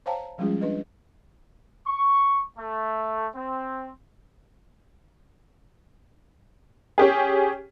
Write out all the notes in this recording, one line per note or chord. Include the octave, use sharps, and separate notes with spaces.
C5 C#5 F5 G5 A5 A#5
F3 G3 G#3 C#4 F4 G#4
D4 B4 D#5
C#6
A3
C4
C#4 G4 G#4